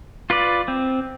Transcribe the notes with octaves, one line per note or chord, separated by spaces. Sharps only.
F4 B4 D5
C4